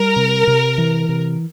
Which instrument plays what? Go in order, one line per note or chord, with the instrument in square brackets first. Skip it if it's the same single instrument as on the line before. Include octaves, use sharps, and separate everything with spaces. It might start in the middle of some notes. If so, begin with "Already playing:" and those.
Already playing: [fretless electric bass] G3 [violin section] A#4
[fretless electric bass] C3
C3
E3
C3